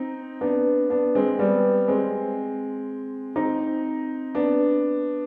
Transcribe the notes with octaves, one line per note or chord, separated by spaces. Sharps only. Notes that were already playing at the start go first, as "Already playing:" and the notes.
Already playing: C4 D#4
B3 D4
B3 D4
G#3 C4
G3 B3
G#3 C4
C4 D#4
B3 D4